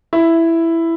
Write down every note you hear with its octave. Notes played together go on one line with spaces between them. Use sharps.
E4